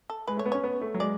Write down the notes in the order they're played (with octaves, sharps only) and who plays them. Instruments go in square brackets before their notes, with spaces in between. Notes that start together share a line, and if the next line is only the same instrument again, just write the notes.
[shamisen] A4
[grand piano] G#3 [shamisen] B4
[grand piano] A3
[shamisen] C#5
[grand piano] B3
[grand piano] C#4 [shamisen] C#5
[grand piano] B3
A3
F#3
[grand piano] G#3 [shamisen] D5